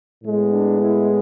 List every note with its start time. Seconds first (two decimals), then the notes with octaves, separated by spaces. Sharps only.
0.22 A2 G#3 B3
0.52 D4
0.82 E4